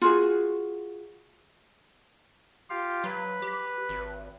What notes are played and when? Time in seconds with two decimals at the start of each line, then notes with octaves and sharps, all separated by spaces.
0.02 F4 F#4 G#4
2.70 F4 G4 F5
3.04 F#3 B4
3.42 G4
3.89 G#1